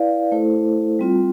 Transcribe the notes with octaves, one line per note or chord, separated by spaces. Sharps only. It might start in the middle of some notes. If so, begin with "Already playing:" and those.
Already playing: E4 B4 D5 F5
A3 E4 A4 C5
G3 C4 F4